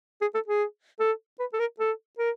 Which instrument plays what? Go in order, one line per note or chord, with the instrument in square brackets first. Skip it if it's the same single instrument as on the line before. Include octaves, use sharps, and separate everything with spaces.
[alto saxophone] G#4
A4
G#4
A4
B4
A4
A#4
A4
A#4